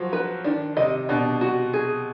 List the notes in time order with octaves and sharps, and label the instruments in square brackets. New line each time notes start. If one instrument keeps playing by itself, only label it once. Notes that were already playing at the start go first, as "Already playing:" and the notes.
Already playing: [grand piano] F3 F#3
[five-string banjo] B4
[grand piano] D#3 [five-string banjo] D4
[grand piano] C3 [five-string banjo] D#5
[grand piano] B2 [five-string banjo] D4
[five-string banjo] F#4
G#4